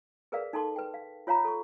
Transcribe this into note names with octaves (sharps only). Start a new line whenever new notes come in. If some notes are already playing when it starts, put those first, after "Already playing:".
G#4 A#4 B4 D5 F5
D#4 A4 A5 C6 D6
B4 G5
F5
F4 C#5 F5 A#5 B5
A4 C#6